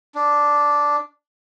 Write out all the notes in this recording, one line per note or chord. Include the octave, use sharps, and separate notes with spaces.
D4